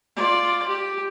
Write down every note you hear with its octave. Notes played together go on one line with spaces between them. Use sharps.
F4 D5
G4